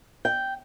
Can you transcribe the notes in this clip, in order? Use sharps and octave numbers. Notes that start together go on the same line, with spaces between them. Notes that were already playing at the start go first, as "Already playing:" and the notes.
G5